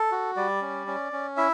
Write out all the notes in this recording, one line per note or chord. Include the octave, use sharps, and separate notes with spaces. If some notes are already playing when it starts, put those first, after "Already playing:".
Already playing: A4
F#4
G3 D5
C#4
C#4
C#4
E4 E5